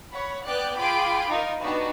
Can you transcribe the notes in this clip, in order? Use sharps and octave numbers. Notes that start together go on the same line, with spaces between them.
C#5 F#5 B5
B3 D5 G5 F#6
F4 G#4 G5 B5 D6 D7
D#4 F4 A#4
B3 D4 D#4 F#4 G4 B4